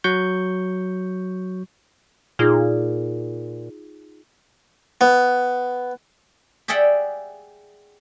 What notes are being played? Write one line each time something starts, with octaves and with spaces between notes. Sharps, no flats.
F#3 C#6 G6
A#2 D#4 F4 G#4
B3
G4 G#4 D5 E5 F#5 G5